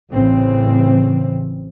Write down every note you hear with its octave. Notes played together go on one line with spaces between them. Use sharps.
A1 C#3 E3 C4